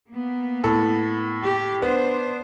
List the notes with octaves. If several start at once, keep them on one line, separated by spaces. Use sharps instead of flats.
A#3 B3
A2 A4
G4
B3 D4 C5